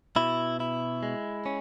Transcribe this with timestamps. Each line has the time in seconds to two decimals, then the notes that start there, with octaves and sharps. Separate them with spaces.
0.16 B2 E4
0.60 E4
1.03 G#3
1.46 C#4